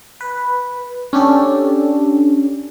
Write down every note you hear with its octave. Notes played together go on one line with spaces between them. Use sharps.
B4
C#4 D4 G4 A4